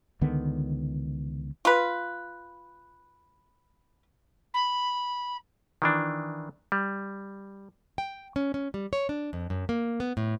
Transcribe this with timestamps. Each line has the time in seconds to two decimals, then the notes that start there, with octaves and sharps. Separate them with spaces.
0.21 C#2 D3 D#3 B3
1.65 F4 B4
4.54 B5
5.82 D#3 E3 D4
6.72 G3
7.98 G5
8.36 C#4
8.54 C#4
8.74 G3
8.93 C#5
9.09 D4
9.33 F2
9.50 F#2
9.69 A#3
10.00 B3
10.17 A2